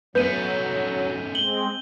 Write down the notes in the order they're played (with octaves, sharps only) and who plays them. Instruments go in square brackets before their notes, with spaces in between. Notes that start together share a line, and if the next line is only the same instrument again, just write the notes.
[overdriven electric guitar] F#2 A3 [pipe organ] F#3 [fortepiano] B3 [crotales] G6 D#7
[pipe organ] G#3 C4 [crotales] F#7 G7